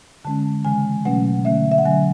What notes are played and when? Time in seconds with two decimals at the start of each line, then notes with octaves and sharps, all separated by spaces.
0.25 D3 G#3 C#4 A5
0.65 C#3 E3 G#3 G#5
1.05 B2 F#3 A3 C#4 F#5
1.45 D3 A3 C#4 E5
1.72 E5
1.78 F#5
1.85 D3 F#3 C#4 G#5